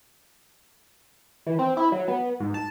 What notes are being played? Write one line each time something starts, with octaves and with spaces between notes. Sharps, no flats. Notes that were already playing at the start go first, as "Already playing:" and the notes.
E3
C4
E4
F#3
B3
G#2
A5